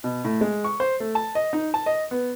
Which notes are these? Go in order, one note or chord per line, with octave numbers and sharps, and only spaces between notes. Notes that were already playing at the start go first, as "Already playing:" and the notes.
B2
A2
G#3
C#6
C5
A3
A5
D#5
D#4
A5
D#5
B3